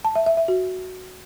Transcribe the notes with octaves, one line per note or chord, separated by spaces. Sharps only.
A5
E5
E5
E5
F#4